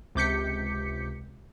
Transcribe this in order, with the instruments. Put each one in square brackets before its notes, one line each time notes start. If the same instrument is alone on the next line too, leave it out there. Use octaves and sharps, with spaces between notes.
[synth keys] C#2 C3 D6 G6 B6 C#7